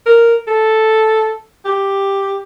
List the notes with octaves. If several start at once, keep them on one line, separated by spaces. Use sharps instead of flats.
A#4
A4
G4